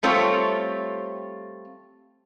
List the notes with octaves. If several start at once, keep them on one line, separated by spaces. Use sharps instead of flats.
G3 A3 C4 F4 C#5